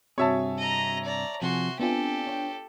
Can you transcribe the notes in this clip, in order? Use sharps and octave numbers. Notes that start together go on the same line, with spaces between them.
G2 C3 C4 F#4 G#4 C#5 E5 A5
D#5 A#5
D5 A#5
C3 F3 C4 F#4 G#4 G#5 C6
B3 C4 D4 F4 G4 A4 G#5
C#5 G5